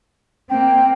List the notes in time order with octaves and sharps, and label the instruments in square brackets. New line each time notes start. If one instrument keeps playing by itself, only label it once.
[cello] A#3 C4 [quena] G5